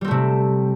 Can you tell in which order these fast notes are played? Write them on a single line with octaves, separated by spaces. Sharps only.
G3 C4 A3 C3